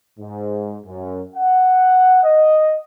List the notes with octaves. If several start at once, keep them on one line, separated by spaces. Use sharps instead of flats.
G#2
F#2
F#5
D#5